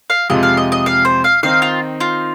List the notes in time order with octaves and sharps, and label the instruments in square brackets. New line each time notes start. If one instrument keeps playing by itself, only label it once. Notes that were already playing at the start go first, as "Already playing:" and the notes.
[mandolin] F5
[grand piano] F2 C3 G#3 F4 [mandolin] D#5
[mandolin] F5
D#5
D#5
F5
C5
F5
[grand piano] D#3 C4 D#4 [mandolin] F5
[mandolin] F4
F4